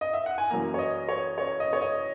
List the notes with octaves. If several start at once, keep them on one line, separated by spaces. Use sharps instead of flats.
D#5
E5
F#5
G#5
F#2 E3 A#3 A#5
C#5
D#5
C#5
C#5
D#5
C#5
D#5